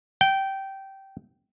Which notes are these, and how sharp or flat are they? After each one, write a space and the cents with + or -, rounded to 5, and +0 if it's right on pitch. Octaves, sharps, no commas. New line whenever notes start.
G5 -15